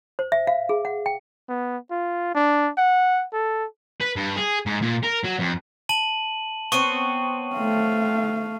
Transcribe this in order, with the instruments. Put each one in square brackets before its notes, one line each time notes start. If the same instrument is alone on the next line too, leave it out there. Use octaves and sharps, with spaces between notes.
[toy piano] C5
E5
F5
G#4
F#5
G5
[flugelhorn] B3
F4
D4
F#5
A4
[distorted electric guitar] B4
G2
G#4
G#2
A#2
A#4
F#3
F2
[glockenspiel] A5 D#7 F#7
[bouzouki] B3 C4 C#5 [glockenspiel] C#6 D#7
[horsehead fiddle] A3 F5